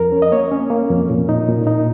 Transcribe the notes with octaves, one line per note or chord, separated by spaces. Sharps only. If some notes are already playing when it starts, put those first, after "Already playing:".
Already playing: F2 A#4
C#4
D#5
A#3 C#5
C#4
A#3
F2
A#2
D#4
A#2
D#4